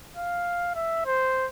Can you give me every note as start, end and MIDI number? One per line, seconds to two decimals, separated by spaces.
0.17 0.72 77
0.75 1.05 76
1.06 1.47 72